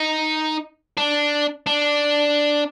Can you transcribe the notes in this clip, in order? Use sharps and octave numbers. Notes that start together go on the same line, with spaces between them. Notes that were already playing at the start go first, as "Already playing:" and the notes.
Already playing: D#4
D4
D4